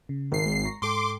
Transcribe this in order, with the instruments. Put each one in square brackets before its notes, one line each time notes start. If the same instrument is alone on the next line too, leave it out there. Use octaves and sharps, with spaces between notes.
[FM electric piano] C#3
[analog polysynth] G#1 C7 [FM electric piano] D#4 A#4
[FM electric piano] G#3
A#5 C#6 A#6
[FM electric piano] G#2 A4 G5 [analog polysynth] C6 D6